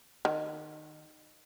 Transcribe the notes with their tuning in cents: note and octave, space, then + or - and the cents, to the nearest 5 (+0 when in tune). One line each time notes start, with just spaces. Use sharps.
D#3 -20